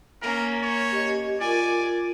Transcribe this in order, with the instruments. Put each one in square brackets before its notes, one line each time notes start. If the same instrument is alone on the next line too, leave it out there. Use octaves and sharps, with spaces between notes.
[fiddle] A#3 C#4 [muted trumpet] A#4
[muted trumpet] C#5
[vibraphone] G4 D#5
[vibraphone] F4 A#4 [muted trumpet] D5 [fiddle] G#5